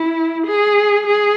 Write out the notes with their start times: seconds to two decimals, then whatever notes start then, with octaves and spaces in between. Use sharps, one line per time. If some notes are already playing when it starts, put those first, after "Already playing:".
Already playing: E4
0.46 G#4
1.06 G#4